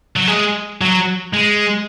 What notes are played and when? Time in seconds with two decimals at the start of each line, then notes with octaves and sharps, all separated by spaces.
0.17 F#3
0.28 G#3
0.81 F#3
1.33 G#3